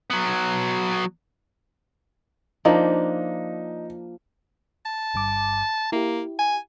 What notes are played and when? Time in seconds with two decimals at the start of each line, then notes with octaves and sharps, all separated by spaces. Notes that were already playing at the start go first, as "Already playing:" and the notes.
0.10 F#3 B3
2.65 F3 A#3 D4 D#4
4.85 A5
5.14 G1 G2 D6
5.92 A#3 E4 G4
6.39 G#5